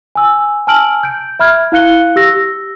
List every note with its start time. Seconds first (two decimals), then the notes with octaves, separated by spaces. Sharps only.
0.15 G#5 E6
0.67 G#5 A5 E6 F6 D7 F#7
1.03 G6 D7
1.39 E5 B5 F6 G#6
1.72 E4 F5 F#6 C#7 G7
2.16 G4 E6 A#6